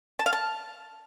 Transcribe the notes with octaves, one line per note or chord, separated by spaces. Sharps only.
A5
F5
A5